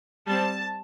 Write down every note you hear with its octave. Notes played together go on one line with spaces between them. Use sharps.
G3 C4 A5